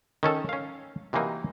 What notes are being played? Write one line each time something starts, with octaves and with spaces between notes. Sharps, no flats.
D#3 C#4 A4
C#4 F5
C3 E3 F#3 A#3 D#4